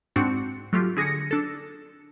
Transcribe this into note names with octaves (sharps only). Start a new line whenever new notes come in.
G#2 C4 D4 F#4 C#7
F#3 A3 F4 G4
D3 G#4 A#6 C#7
D4 A4